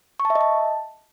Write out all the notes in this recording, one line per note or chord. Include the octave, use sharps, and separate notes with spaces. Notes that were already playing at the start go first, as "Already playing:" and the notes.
C#6
A5
E5
D#5
A5